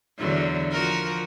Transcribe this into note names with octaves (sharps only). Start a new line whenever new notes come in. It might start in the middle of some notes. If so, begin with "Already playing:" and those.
E2 D3 F#3
F3 F#4 A#4